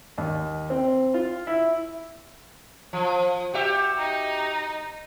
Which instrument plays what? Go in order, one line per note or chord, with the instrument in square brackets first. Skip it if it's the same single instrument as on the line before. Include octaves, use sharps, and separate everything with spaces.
[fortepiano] D#2
C4
F4
E4
[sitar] F3
F#4 G4 E5
[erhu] D#4